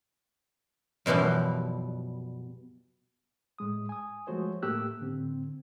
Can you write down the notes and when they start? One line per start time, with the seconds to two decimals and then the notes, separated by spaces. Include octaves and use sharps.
1.06 F#2 B2 E3 F3 G3
3.58 A2 G#3 D#6
3.89 G#5 D#6
4.27 F3 G#3 A3 F#4 C5 C#5
4.62 A2 A3 A#3 G4 E6 F#6
4.99 A2 D3 C4